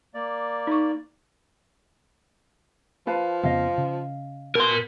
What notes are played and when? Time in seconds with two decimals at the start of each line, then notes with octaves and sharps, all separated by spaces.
0.14 A#3 D5
0.67 D#4 C#6
3.07 F3 B4 F5 A5
3.43 F2 C#3 B3 D#5 F5
3.78 C#3
4.55 B2 A#4 C6